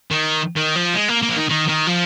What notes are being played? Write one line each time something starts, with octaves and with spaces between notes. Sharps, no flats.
D#3
D#3
F3
G#3
A#3
A#3
F3
D#3
D#3
D#3
F3